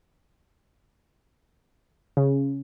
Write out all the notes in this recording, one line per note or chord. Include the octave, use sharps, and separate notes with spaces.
C#3